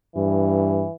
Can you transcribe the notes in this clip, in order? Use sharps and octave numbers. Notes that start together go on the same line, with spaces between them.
G2 E3